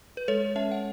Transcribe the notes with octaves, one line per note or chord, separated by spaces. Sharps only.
B4
G#3 A4 C#5
C#4 C#5 E5
F#5